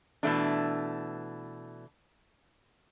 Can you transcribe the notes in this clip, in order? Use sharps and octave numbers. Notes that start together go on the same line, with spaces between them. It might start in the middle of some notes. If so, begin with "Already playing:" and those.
B2 E3 A3 D4